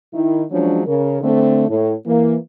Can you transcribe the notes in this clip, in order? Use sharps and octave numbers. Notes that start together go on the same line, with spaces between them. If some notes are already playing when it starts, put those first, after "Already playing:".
D#3 E4
F3 F#3 G#3 C#4 D4
C#3 A#4
D3 A3 C4
A2
E3 A#3